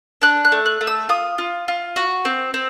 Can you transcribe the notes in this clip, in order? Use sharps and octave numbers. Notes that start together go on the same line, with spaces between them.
D4 F#6
F#6
A3
F#6
A3
E6
F4 D#6
F4
F4
F#4
C4
C4